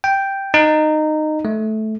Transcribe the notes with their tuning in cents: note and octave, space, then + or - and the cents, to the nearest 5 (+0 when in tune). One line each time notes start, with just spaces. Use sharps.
G5 +0
D#4 -15
A3 -15